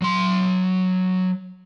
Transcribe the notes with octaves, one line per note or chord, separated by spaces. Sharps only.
F#3 C6